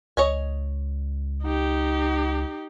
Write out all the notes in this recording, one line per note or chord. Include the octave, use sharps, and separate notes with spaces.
C#2 C#5 D#5 G#5
D#4 G4